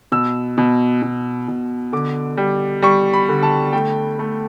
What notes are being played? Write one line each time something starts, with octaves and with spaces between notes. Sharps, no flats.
B2 E6
B2
B2
B2
D3 D6
G3
G3 C#6
B5
D3
A5
A3 G5
A3